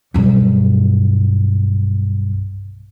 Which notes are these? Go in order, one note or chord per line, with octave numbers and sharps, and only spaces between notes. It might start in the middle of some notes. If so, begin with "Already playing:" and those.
B1 G2